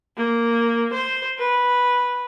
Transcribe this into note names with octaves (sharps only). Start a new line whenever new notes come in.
A#3
C5
B4